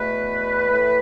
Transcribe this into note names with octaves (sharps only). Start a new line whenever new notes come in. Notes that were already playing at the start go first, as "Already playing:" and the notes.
Already playing: E2 B2 A3 B4
A2 E3 A3